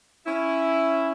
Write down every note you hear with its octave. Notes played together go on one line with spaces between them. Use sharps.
C#4 E4